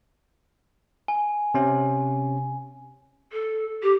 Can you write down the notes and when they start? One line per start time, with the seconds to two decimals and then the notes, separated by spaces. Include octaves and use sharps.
1.08 G#5
1.54 C3 C#4
3.33 A4
3.83 G4